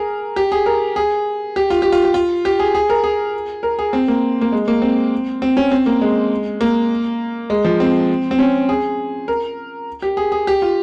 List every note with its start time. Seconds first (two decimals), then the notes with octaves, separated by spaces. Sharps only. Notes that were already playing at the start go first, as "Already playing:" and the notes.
Already playing: G#4 A#4
0.36 G4
0.52 G#4
0.66 A#4
0.96 G#4
1.56 G4
1.70 F4
1.82 G4
1.92 F4
2.04 G4
2.14 F4
2.45 G4
2.59 G#4
2.75 G#4
2.90 A#4
3.04 G#4
3.63 A#4
3.79 G#4
3.93 C4
4.08 A#3
4.41 A#3
4.52 G#3
4.68 A#3
4.82 C4
5.42 C4
5.57 C#4
5.71 C4
5.86 A#3
6.01 G#3
6.61 A#3
7.50 G#3
7.65 F3
7.80 C4
8.31 C4
8.39 C#4
8.69 G#4
9.28 A#4
10.02 G4
10.17 G#4
10.32 G#4
10.47 G4
10.62 F4